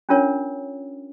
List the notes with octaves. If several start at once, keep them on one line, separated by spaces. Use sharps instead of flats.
C#4 D4 F4 A#4 C#5